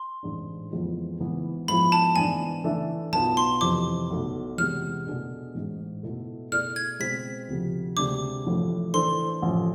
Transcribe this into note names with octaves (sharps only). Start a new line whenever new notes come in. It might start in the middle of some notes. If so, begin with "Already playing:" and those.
Already playing: C6
A1 G#2 G#3 D4
F2 E3 G#3 B3 F4
G#1 G#2 E3 B3
G#2 F3 B3 E4 G#4 B5
A5
G#2 E3 B3 D4 G#5
E3 A3 D4 A4 E5
B1 B2 B3 F4 A5
C6
F2 C3 E3 D6
B1 B2 A3
E2 C3 G#3 F6
B2 A3 D4 G#4
A1 G#2 G#3
B2 A3 E4 A4
B2 A3 E4 G#4 D5 F6
G#6
B2 G#3 C4 B6
D2 C3 F3
D2 C3 G#3 D4 D6
A1 A2 F3
E3 A3 D4 A4 C5 C6
A1 A2 F3